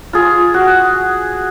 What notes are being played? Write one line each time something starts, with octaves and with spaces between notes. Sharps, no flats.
F4 G#4
F#4